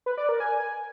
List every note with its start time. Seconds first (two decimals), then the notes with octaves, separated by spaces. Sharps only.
0.06 B4
0.17 D5
0.29 A#4
0.40 G#5